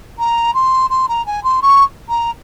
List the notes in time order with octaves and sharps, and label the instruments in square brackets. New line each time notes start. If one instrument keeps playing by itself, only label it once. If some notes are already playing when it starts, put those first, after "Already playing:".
[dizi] A#5
C6
C6
A#5
G#5
C6
C#6
A#5